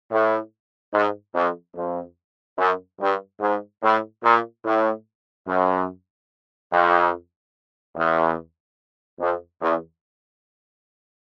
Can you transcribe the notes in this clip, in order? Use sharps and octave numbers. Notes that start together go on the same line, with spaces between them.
A2
G#2
F2
F2
F#2
G2
G#2
A2
A#2
A2
F#2
F2
E2
F2
E2